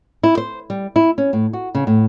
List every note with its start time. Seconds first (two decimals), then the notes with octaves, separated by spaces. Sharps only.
0.23 E4
0.37 C5
0.70 G3
0.96 E4
1.18 C#4
1.33 A2
1.53 F#4
1.75 C#3
1.87 A2